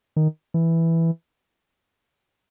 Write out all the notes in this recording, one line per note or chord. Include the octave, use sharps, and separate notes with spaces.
D#3
E3